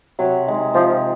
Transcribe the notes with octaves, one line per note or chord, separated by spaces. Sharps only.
C3 F#3
D#3 G#3
C3 F3